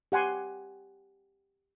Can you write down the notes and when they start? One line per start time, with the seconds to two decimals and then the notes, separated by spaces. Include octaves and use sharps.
0.12 G4 F#5 G#5 C6